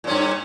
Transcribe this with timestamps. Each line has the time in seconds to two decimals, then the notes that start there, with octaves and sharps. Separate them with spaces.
0.04 A#2
0.07 C#4
0.10 G2